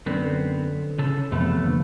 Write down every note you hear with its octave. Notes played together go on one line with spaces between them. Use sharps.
F#2 D3 B3 C4
C#3 A4
F2 C3 E3 F#3 A3 B3
D3 F3 A#3